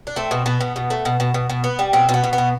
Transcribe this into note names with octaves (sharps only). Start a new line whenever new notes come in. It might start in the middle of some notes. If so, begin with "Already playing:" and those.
D4
A3 C4
B2
B2 B3
B2
B2
A3
B2
B2
B2
B2
B3
G3
B2 C4
B2
B3
B2
B3
B2